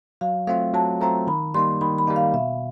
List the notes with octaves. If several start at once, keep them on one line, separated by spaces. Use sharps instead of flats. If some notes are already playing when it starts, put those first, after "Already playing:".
F#3 F5
A3 C4 F4 F5
F#3 A5
A3 C4 F4 A#5
D#3 B5
G3 A#3 D#4 C6
D#3 B5
B5
G3 A#3 D#4
F5
B2 E5